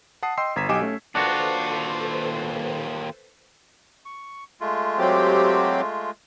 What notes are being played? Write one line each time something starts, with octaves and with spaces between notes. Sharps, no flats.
F#5 A5 D#6 C7
D#5 G5 C6 E6 C7
G1 A#5 G#6 B6 E7
B1 G4 D#5 G#5 D6 E7
A3 C#4
D#2 D4 F4 F#4 A4 B4 C5
C#6
G#3 A3 F4
F#3 C4 G4